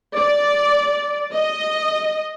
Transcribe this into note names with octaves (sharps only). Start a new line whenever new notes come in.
D5
D#5